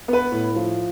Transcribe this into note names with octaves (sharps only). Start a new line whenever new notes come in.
B3 B4
A2
F3